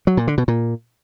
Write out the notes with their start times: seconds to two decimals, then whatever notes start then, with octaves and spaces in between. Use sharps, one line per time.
0.07 F#3
0.17 A#2
0.28 D3
0.38 B2
0.48 A#2